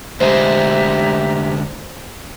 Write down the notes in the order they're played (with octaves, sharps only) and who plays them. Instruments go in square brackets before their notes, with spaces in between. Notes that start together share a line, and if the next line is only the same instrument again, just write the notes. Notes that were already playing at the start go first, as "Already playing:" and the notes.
[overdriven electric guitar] D2 G#3 [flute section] G4 E5 A#5 [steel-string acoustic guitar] C5